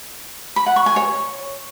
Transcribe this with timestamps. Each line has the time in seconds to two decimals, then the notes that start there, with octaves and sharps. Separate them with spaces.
0.56 B5
0.66 F#5
0.76 C#6
0.86 G#5
0.96 C#5